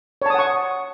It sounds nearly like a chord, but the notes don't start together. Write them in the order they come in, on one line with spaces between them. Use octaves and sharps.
C#5 A5 D#6 F#5 C#6